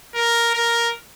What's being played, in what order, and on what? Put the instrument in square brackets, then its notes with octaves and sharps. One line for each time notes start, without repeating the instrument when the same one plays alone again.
[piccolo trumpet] A#4
A#4